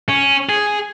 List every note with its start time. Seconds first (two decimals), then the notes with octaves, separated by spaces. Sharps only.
0.09 C#4
0.49 G#4